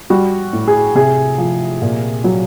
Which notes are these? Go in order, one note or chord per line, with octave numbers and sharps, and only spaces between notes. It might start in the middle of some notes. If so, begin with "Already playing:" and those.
G3 F#4
A2
G#4
C3 G#4
F3
A#2
F#3